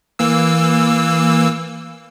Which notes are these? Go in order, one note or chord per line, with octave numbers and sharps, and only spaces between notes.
E3 A#3 E6